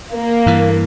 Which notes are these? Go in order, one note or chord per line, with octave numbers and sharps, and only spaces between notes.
A#3
G2 E3